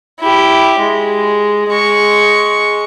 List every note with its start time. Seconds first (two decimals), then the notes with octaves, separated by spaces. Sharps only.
0.20 E4 G4
0.79 G#3
1.69 G#3 C#6